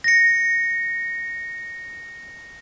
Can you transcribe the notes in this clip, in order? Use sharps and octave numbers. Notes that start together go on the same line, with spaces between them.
A#6 C#7